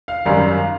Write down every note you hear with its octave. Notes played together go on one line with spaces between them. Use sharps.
F5
G#1 F#2 D#3 G3 F5